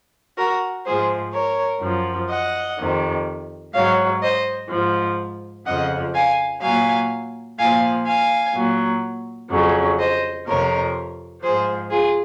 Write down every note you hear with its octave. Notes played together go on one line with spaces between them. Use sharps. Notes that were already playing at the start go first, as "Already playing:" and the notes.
F#4 A#4
G#2 F3 G#4 C5
A#4 C#5
F#2 F3
D#5 F#5
F2 C3 D#3
G#2 F#3 C#5 F5
C5 D#5
G#2 F3
F2 C#3 F3 D#5 F#5
F5 G#5
A#2 F#3 F5 G#5
A#2 F3 F5 G#5
F5 G#5
A#2 F#3
F2 C#3 F#3
C5 D#5
F2 C3 F3 A#4 C#5
G#2 F3 G#4 C5
F4 G#4